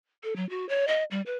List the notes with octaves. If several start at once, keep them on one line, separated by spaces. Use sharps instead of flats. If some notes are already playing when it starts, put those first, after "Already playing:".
A4
F#3
F#4
C#5
D#5
G3
B4